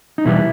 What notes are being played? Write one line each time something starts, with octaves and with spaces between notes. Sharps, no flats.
D#4
E2 B2 G3 B3 E4